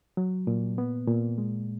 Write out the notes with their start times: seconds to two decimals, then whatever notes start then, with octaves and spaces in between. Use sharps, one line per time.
0.17 F#3
0.47 A#2
0.78 B3
1.08 A#2
1.38 G#3